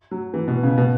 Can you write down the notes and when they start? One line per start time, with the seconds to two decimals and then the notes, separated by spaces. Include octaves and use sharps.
0.11 F#3
0.34 E3
0.48 B2
0.63 C#3
0.78 B2